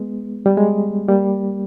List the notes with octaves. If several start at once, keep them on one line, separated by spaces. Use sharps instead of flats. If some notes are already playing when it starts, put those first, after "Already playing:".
Already playing: G#3 B3
G3
G#3
G3 A#3